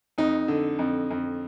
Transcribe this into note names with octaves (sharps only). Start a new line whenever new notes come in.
F2 D#4
D3
F2
F2